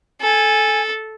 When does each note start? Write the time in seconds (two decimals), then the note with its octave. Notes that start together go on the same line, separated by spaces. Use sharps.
0.21 A4 G#5